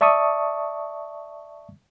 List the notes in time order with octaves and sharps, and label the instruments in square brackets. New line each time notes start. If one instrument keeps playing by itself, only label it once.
[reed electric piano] D5 E5 A5 C#6 D#6